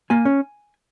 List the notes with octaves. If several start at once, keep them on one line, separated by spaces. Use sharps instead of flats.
A#3 G#5
C#4